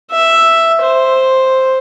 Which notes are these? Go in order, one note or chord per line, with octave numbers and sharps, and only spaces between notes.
E5
C5